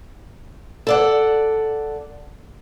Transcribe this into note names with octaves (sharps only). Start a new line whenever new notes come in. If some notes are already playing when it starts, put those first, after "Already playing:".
A4 D5 F#5